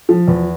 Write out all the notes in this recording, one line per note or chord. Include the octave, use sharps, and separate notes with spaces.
F3
E2